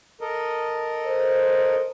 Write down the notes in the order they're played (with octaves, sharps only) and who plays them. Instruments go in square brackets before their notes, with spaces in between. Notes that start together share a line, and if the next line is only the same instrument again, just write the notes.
[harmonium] A4 A#4 D#5
[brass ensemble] C5